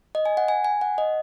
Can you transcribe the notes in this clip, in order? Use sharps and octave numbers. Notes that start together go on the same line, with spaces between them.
D#5
G#5
F#5
G#5
G#5
F#5
D#5